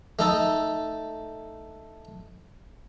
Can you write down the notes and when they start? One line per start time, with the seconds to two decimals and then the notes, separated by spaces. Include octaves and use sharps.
0.19 A3 D#4 A4